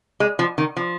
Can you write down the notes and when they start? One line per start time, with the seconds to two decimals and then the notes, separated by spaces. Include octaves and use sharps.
0.20 G#3
0.39 F3
0.58 D#3
0.77 F3